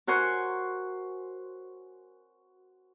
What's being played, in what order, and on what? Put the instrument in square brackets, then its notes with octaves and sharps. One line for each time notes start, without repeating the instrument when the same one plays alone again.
[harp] F#4 A#4 C5 G#5 C#6 F#6